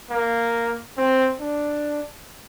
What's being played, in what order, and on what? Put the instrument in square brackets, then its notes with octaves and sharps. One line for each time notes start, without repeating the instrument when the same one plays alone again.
[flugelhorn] A#3
C4
D4